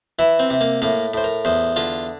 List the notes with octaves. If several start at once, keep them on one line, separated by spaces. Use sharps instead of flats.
E3 E4
C4
C3
A#3
A2 A#3
A2 C5
A#4
E2 C5
D3 F4